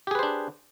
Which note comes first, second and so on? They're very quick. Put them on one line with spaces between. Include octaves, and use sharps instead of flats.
G4 G#4 B4 C5 D4